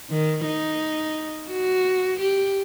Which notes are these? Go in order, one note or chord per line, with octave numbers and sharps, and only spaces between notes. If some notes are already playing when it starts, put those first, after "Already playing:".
D#3
D#4
F#4
G4